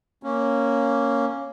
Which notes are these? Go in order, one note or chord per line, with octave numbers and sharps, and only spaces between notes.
A#3 C#4